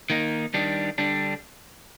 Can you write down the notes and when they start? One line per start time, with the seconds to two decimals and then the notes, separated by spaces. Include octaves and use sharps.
0.10 D#3 A#3 D#4
0.54 D#3 G3 D4
0.98 D3 G3 D4